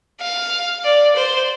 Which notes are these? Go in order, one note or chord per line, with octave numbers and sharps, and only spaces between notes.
F5
D5
C5